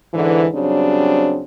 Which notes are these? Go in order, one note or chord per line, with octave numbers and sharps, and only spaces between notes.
G#2 D3 E3
C#3 F#3 G3 C4 D4